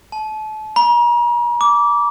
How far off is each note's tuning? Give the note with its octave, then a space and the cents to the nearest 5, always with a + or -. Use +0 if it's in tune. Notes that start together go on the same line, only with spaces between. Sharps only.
A5 -30
A#5 +40
D6 -15